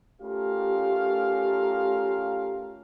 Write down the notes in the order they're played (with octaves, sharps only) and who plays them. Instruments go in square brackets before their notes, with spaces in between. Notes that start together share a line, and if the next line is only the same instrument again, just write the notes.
[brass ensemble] A3 C#4 F4 G4 A#4 F5